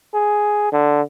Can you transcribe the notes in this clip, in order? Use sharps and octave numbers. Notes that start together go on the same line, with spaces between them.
G#4
D3